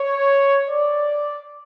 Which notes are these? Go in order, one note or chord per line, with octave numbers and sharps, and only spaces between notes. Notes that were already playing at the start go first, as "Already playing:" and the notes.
Already playing: C#5
D5